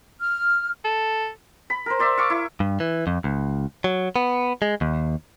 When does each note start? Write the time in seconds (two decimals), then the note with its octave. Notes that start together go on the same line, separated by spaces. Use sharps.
0.20 F6
0.84 A4
1.70 B5
1.86 A#4 C5
1.99 C5 D5 E5
2.18 F5 C#6 D6
2.30 E4
2.60 G2
2.80 E3
3.07 F2
3.24 C#2
3.84 F#3
4.16 B3
4.62 G#3
4.81 D#2